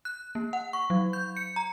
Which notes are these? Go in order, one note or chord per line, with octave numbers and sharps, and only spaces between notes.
F#6
A#3
F#5
C#6
F#3
G6
C#7
A#5